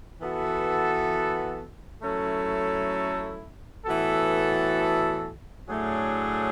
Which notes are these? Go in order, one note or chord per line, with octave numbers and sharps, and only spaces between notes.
E3 B3 F#4 A4
F#3 A3 C#4 E4 A4
A2 E3 B3 F#4 A4
A2 F#3 A3 D4 G#4